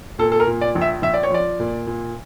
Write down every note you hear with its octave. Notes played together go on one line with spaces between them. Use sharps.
A#2 A4
A4
A#4
A#2
D5
A#1
E5
A#1 E5
D5
C#5
F3 D5
A#2
A#2